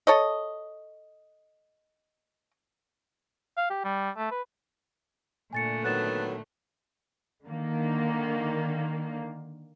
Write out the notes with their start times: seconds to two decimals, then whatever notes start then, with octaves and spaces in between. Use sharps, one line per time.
0.07 A4 C#5 D#5
3.57 F5
3.70 G4
3.84 G3
4.17 A3
4.31 B4
5.53 A#2 D3 A3 G#5 A6 C#7
5.84 D#3 F#3 B3 F#6 A6 E7
7.45 D3 D#3 A#3